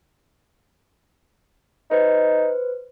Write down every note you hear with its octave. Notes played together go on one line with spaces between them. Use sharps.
D#4 B4 C5